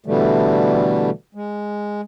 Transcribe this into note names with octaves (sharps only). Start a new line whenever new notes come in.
B2 D3 E3 G3 A3
G#3